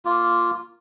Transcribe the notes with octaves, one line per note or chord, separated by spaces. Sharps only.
A#3 F4